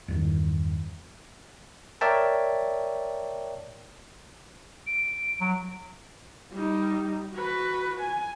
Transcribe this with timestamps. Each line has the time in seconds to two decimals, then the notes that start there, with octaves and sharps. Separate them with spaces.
0.08 E2 G2 D#3
2.01 A#4 C#5 D5 E5 G5 A5
4.87 D7
5.41 F#3
6.52 G3 D#4
7.34 F#4 B4
8.00 G#5